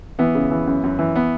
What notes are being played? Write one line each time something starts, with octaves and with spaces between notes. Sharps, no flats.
E3 B3
C#3
E3
F#2
F#2
E3
B3